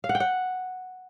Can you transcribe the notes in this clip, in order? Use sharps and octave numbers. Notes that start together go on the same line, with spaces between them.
F5
F#5
G5
F#5